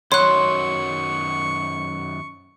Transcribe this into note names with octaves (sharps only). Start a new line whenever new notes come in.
F#2 D#3 F#3 C#5 C6 C#6 F#6